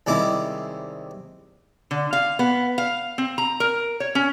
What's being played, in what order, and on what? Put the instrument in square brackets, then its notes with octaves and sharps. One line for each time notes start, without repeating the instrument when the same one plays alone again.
[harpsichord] D#2 C3 G3 G#3 E4 D6
[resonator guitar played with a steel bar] D3
F5
B3
F5
C4
A#5
A#4
C#5
C#4